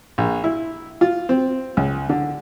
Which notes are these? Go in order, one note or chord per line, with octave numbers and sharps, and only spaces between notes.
A#1
E4
F4
C4
C#2
D3